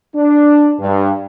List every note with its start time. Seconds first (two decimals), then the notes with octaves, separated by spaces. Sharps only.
0.16 D4
0.80 G2